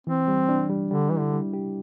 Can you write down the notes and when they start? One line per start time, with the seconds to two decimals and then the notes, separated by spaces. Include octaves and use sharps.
0.07 E3 C4
0.28 G3
0.49 D4
0.69 G3
0.91 D3 G3
1.10 E3 E4
1.19 D3
1.33 G3
1.53 G4